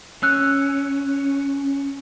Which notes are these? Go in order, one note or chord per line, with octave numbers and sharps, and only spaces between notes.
C#4 E6 F#6